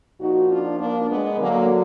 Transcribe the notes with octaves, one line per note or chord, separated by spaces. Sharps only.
A#2 F3 D#4 F#4
D4 F4
A#3 D4
G#3 B3
D3 F#3 A#3